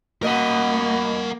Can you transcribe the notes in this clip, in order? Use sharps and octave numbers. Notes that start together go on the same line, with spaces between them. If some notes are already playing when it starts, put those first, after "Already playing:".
B2 A#3 A#4 D#5 F#5